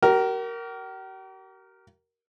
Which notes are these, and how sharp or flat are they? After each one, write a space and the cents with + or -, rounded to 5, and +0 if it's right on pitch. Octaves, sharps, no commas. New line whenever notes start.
G4 -45 A#4 +0